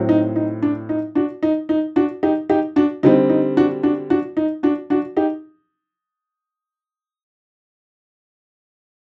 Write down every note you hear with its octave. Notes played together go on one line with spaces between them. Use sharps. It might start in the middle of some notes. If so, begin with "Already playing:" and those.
Already playing: A2 F#3 C4
D#4
D#4
D4
D#4
D4 F#4
D#4
D#4
D4 F#4
D#4 G4
D#4 G4
D4 F#4
D3 G3 C4 D#4
D#4
D4 F#4
D4 F#4
D4 F#4
D#4
D4 F#4
D4 F#4
D#4 G4